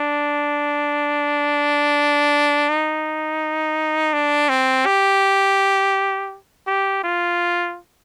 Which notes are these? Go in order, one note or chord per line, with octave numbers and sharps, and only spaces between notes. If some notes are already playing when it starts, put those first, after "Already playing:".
Already playing: D4
D#4
D4
C4
G4
G4
F4